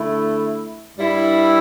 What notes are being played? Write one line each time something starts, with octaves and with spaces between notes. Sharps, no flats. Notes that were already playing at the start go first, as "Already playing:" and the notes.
Already playing: D3 A3 E4
G2 G3 E4